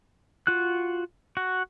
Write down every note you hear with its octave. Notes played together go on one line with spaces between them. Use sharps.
F4 F#4 F#6
F#4